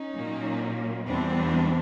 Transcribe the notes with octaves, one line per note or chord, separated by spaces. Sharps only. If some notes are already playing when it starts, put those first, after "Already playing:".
Already playing: C#4 D#4
A#2 F#3 A#3
E2 C3 E3 G3 B3 C4 D4